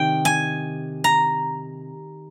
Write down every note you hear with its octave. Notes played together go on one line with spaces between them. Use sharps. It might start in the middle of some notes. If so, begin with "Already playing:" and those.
Already playing: C3 D#3 G5
G#5
A#5